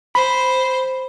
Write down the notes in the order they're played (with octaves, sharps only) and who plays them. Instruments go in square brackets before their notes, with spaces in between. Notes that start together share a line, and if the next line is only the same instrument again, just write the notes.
[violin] C5 [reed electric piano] B5